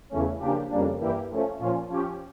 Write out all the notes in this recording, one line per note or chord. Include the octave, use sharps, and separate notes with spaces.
E2 C#3 E3 A3 C#4
C#3 F3 A#3 D4 G4
F2 C#3 G3 A#3 D4
G2 E3 A#3 E4 G4
F3 A3 C#4
A#2 F3 C#4 F4
F3 C#4 G4